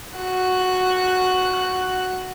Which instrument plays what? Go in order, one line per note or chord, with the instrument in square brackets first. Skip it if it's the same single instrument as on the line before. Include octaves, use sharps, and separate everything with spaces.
[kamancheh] F#4 F#6